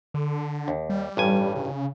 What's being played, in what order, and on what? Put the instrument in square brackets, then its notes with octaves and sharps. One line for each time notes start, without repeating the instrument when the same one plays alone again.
[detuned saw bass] D3
[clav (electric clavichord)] D#2
[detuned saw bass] G3
[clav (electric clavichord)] A1 G2 G#5
[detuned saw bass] C#3